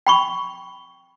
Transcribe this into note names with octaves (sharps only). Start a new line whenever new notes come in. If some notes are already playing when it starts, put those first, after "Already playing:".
G5 B5 C#6